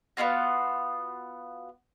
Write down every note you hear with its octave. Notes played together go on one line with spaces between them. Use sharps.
B3 D4 F4 F#4